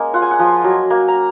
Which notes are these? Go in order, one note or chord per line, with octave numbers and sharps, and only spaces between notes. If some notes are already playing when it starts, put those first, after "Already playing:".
Already playing: G#3 A#3 C#4 D#5
F4 F#5
G#5
F#5
F3
F#3
A#3
A#5